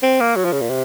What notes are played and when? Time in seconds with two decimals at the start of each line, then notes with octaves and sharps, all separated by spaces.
0.03 C4
0.20 A#3
0.36 F#3
0.45 F3
0.52 C#3
0.61 A#2
0.69 C3